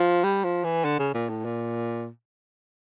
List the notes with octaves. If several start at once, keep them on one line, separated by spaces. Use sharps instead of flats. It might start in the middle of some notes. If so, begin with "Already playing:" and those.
Already playing: F3
G3
F3
E3
D3
C#3
A#2
A2
A#2